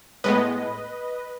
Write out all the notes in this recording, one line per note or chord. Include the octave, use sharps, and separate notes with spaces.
A2 G#3 B3 B4 D#5